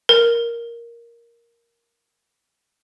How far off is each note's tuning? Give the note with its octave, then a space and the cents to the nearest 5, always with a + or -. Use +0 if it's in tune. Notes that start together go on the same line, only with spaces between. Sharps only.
A#4 +5